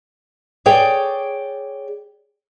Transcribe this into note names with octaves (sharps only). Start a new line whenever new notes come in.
G#4 C#5 D5 G5